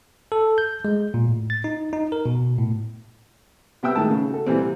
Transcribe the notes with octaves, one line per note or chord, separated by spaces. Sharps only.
A4
G6
G#3
A#2
A2
A6
D#4
D#4
A#4
B2
A2
C3 B3 E5 G5 E6
A2 D#3 G#3 A5
C#3
F#4 A4
A#2 E3 G3 C4
C3